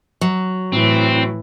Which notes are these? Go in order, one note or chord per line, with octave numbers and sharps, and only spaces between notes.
F#3
A2 E3 C4